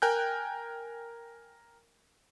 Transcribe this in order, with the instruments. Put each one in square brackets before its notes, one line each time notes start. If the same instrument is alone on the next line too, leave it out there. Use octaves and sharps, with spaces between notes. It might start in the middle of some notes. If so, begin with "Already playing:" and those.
[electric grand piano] A#4 G5 G#5 F#6 G6